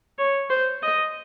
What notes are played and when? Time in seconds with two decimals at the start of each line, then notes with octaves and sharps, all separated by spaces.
0.19 C#5
0.50 C5
0.83 D#5